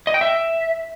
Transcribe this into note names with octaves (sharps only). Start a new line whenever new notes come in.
D#5
G5
E5